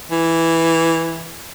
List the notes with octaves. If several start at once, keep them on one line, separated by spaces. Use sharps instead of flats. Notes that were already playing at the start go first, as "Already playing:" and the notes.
E3